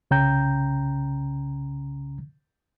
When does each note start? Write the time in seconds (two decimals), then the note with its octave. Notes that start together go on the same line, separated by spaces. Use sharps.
0.11 C2 C#3 C#4 G5 A#5 G6